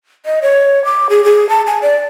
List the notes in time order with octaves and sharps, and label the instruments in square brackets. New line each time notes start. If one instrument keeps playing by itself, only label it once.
[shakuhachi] D#5
C#5
D6
G#4
G#4
A5
G#5
D5